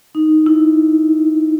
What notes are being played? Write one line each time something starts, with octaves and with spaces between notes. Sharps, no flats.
D#4
E4